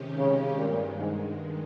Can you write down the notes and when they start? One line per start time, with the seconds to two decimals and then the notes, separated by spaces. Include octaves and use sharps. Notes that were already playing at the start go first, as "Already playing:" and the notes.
Already playing: C3 D#3 G#3 C#4 G4
0.17 C#3
0.57 G2 A#2 D#3 G#3
0.97 G#2